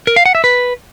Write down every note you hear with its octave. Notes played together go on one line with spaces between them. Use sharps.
A#4
F5
F#5
E5
B4